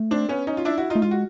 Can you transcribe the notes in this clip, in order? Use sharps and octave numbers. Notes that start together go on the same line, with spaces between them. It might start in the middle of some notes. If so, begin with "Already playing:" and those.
Already playing: A3
C4 D4
B3 C#4
C#4 D#4
F4
D4 E4
E4 F#4
D#4 F4
A3
G#3 F4
F#4